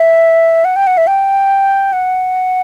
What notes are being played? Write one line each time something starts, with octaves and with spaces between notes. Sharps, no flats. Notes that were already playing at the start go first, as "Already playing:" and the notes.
Already playing: E5
F#5
G5
F#5
E5
G5
F#5